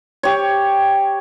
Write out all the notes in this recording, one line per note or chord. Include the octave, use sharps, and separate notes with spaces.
G4 C#5